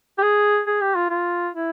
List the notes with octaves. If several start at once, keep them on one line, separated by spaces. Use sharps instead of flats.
G4
G#4
G#4
G4
F4
F4
E4